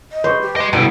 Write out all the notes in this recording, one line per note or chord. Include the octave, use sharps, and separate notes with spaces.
D#5
B4 C5 C#6
G4
D#5 C6
C2 B2 D3 E4